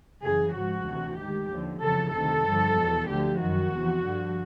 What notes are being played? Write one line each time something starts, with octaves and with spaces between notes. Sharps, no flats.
F#2 C#3 E3 G#4
G#2 F3 F#4
D2 C3 E3
G#2 D#3 G4
D#2 D3 F3
F2 C#3 E3 A4
D2 C3 D#3 A4
G2 D3 F3
E2 B2
D2 D3 F3 G4
F#2 D#3 F#4
E2 C3 F3
G2 D3 F3